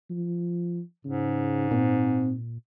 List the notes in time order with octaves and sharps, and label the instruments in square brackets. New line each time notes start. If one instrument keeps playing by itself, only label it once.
[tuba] F3
[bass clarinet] G#2 [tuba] C#3
[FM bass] A#2 [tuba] C4